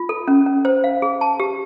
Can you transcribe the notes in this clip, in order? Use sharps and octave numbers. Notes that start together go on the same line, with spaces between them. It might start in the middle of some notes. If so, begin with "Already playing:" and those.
Already playing: F4
A4
C#4
C#4
C5
F5
G#4
A5
G4